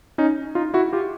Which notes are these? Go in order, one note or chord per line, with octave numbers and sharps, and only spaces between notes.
C#4 D#4
D#4 F4
E4 F#4
F4 G4